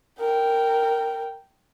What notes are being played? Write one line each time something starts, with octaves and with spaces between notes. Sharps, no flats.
A#4 G5